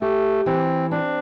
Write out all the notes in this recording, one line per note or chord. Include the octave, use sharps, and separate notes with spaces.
A3 G4
E3 C4
C4 D4